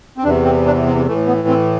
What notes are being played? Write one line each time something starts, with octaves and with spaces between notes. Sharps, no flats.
C4
E2 C3 E3 D4
C4
D4
C4
A2 E3 A3
B3
C4